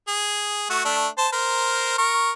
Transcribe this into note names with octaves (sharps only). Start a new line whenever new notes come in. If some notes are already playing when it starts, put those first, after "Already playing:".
G#4
A3 F#4
A3 D4
C5 A5
A#4 C5
A#4 C#6